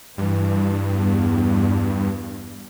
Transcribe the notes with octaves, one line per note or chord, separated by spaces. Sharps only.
G2 E3
E2